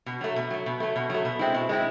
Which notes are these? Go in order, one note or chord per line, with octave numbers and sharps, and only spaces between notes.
B2
F#3 A3
B2
F#3 A3
B2
F#3 A3
B2
F#3 A3
B2
G#3 C4 E4
B2
G#3 C4 E4